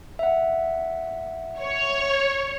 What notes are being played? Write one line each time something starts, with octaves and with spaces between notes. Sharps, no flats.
E5 F#5
C#5